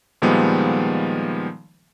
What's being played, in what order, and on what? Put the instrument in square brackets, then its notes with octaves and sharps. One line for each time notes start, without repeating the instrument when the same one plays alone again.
[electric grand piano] A#2 D#3 F3 G3 G#3 B3